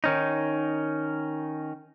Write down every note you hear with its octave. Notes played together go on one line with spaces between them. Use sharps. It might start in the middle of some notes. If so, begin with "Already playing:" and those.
D#3 C#4 D#4